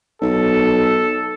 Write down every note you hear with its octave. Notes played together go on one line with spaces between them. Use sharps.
B1 A4